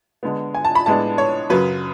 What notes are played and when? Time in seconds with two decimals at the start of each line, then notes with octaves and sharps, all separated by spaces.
0.23 D3 G#3 B3
0.55 G#5
0.65 A5
0.75 B5
0.86 A2 G#3 B3 D4 A5
1.18 C#5
1.50 F#2 C#3 F#3 B4